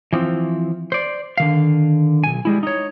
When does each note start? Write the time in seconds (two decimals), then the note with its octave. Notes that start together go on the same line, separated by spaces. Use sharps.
0.13 E3 F3 C4
0.92 C5 D5
1.38 D3 D#3 F5
2.24 B1 G#5
2.45 G3 G#3 E4
2.63 D#4 C#5